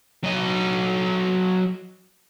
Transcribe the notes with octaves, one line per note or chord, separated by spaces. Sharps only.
F#3 D#5